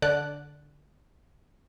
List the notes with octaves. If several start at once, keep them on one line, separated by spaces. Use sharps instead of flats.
D3 D5 F#6